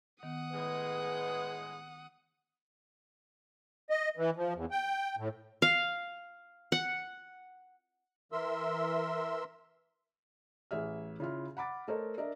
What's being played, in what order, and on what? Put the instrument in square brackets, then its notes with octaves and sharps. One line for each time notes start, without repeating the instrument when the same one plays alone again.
[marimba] D#3 B3 [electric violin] F#5 D#6
[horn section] A2 G#3 [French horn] B4
[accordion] D#5
E3
F3
E2
G5
A2
[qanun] F5
F#5
[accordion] E3 A#4 E5 C6 E6
[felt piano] A1 G#4 E5 F6
C#3 E4 F4 F6
F#5 B5 D6 A6
A3 A4 A#4 C5 C#5 D#5
D4 A#4 D#5 E5